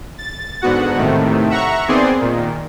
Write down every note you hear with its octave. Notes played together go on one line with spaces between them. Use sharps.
A6
G#2 D3 B3 F#4 F#5
A2 C3 D#3 A3
E5 F#5 A#5 C#6
D#3 B3 C4 G#4 D5 C6
A#2 D#3